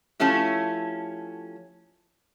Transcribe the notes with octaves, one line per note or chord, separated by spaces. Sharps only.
F3 A3 C#4 E4 G4